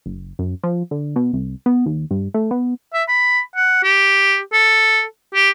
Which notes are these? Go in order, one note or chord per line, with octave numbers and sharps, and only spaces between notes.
F#1
F#2
F3
D3
B2
C2
B3
D#2
G2
A3
B3
E5
B5
F#5
G4
A4
G4